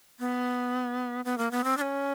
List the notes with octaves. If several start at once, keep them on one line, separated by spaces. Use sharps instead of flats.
B3
B3
A#3
B3
C4
D4
C#4